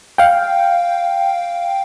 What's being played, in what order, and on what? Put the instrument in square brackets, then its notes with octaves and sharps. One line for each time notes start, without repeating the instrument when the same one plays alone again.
[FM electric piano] F5 G5